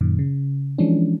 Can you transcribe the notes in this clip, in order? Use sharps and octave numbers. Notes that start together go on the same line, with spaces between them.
F#2 A#2 D#3
C#3
E3 F3 G#3 C#4 D4